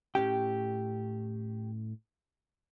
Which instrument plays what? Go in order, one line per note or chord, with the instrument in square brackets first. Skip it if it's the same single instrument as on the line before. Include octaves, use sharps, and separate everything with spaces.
[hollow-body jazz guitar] A2 C#4 G5 [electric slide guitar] G4